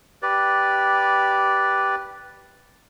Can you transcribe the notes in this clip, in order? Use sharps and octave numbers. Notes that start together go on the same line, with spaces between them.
G4 B4 D5